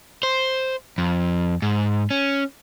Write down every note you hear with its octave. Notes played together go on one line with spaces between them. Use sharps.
C5
F2
G#2
C#4